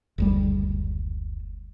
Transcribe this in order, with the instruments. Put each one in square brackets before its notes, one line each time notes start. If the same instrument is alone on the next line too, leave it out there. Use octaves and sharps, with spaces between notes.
[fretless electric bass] F#1 D2 G3